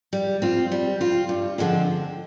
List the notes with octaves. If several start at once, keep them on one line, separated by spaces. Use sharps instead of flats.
G3
C4 F4
G3
C4 F4
G2
D3 F3 G#3 C4